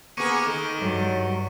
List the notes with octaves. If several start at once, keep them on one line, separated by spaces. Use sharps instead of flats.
A#3 B3 G#4 C#6 C#7 D#7
D#3 A4
G2 F#3